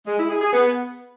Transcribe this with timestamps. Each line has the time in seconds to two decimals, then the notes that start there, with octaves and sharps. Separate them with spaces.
0.06 G#3
0.18 E4
0.30 G#4
0.41 G#4
0.53 B3